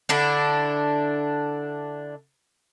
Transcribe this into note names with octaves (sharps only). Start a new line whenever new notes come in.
D3 D4 E4